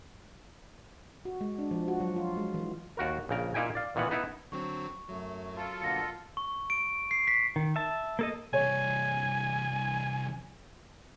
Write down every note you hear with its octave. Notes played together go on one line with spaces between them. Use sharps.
F#4
G#3
D4
F3
F#4
F#3
F4
G#3
E3
D#2 F#4 A#4
A#1 C#3 A#4
A#2 A#3 D#4 E4 G5 G#5
D5 F5
A#2 D#3 E3 B3 F#5
B3 D#4 E4
D3 F#3 C4 C#6
F#2 F#3 A3
F4 A4
B2 D3 A#3 A5 A#6 C#7
C#6
D7
C7
B6
D#3
E5 A5
A#3 A4 D#5
C2 E3 C#5 G#5